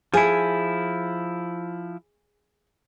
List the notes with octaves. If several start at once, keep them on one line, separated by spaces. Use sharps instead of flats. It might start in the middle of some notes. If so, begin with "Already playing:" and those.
F3 E4 G#4